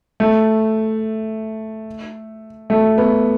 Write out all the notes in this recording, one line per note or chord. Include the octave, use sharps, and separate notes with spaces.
A3
A3
B3